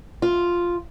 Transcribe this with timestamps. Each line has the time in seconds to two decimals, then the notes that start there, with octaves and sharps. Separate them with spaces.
0.22 F4